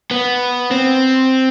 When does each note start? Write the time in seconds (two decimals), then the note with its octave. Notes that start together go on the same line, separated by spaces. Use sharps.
0.11 B3
0.71 C4